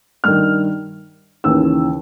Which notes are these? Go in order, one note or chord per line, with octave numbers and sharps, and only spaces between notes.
G2 D#3 F6
D#2 C#3 E3 E6